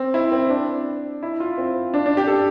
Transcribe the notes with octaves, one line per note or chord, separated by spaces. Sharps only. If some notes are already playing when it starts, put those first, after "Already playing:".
Already playing: C4
E4
C4
D4
E4
F4
C4
D4
D4
G4
A4